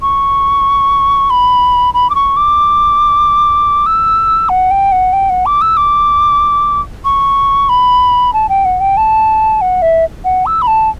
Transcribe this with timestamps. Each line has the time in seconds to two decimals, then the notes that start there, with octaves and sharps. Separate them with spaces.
0.02 C#6
1.30 B5
1.94 B5
2.10 D6
2.15 C#6
2.36 D6
3.86 E6
4.49 F#5
4.71 G5
4.92 F#5
5.13 G5
5.30 F#5
5.46 D6
5.61 E6
5.77 D6
7.05 C#6
7.69 B5
8.33 A5
8.49 G5
8.65 F#5
8.80 G5
8.97 A5
9.61 F#5
9.82 E5
10.25 F#5
10.46 E6
10.62 B5
10.67 A5